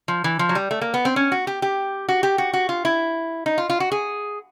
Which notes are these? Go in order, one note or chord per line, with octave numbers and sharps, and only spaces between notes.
F3
E3
F3
F#3
G3
A3
A#3
B3
C4
C#4
F#4
G4
G4
F#4
G4
F#4
F#4
F4
E4
D#4
F4
F4
F#4
G#4